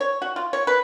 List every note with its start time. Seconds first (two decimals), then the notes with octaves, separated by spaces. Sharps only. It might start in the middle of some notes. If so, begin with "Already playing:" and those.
0.01 C#5
0.22 F#4
0.36 F4
0.53 C#5
0.67 B4